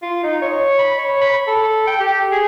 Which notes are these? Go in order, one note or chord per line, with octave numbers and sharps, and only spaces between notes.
F4
D#4
C#5
B5
C#5
B5
A4
G5
G4
G#4